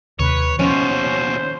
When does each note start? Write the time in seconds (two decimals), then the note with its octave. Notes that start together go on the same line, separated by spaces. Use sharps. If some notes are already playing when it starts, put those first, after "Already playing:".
0.19 D#2 C3 B4 C#5
0.59 D#2 B2 F3 C#4 C5